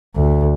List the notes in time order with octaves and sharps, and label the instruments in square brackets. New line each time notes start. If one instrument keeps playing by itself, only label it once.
[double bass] D2